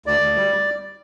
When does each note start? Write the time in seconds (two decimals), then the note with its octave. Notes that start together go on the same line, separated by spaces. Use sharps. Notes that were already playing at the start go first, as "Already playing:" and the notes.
0.06 D2 D5
0.21 D2
0.36 G3